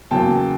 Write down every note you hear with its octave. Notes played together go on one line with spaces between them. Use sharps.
E2 C#3 F#3 A#3 G5 A5